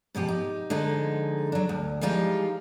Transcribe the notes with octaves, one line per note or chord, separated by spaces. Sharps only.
G#2 B2 F3 G4
D#4
D3 F3 G#3 D#4 G#4
F#3 D4
D2
E3 F3 G3 G#3 D#4 F4